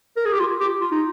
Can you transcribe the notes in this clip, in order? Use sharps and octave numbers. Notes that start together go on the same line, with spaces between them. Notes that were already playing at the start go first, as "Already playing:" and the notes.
A#4
G#4
G4
F4
G4
F4
D#4